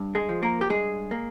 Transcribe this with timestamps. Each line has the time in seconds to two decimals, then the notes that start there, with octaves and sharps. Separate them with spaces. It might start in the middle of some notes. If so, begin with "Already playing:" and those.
Already playing: G2
0.15 G#3 G#4
0.29 F3
0.43 A#3 A#4
0.61 G4
0.70 G2 G#3 G#4
1.11 A#3